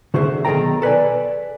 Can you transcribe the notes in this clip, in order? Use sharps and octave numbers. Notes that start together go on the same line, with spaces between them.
D3 F#4 G#4 C5 D5 E5
B1 D#3 G#4 A4 G5 A#5
A4 B4 D5 G#5